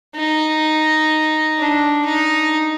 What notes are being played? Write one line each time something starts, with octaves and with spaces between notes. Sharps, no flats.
D#4
D4
D#4